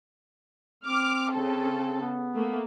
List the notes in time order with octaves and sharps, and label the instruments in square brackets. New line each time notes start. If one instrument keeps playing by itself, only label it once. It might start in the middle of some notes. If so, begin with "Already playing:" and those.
[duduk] C4 [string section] D6 F6
[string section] C#3 A4
[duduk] B3
[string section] A3 A#3